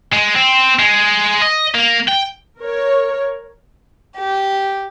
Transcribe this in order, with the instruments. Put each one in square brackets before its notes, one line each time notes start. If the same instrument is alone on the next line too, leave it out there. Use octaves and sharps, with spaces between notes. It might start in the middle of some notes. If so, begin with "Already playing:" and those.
[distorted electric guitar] G#3
C4
G#3
D#5
A#3
G5
[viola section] A#4 C#5
[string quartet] G4